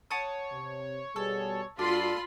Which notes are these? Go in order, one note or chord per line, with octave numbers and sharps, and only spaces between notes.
C#5 F#5 A5 D#6
C3
B2 G3 G#4 A4
G2 F4 F#4 A4 D5 B5 C6